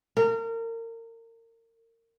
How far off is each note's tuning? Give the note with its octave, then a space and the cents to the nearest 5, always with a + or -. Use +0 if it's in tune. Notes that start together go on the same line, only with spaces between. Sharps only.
A#4 -30